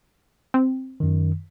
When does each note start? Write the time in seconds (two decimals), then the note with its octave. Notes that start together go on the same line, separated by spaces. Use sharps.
0.54 C4
1.00 F#2 D#3